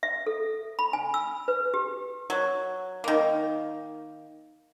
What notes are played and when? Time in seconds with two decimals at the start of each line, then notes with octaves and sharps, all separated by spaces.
0.03 E5
0.27 A4
0.79 B5
0.93 G#5
1.14 E6
1.48 B4
1.74 G4
2.30 F#3
3.04 D#3 A#3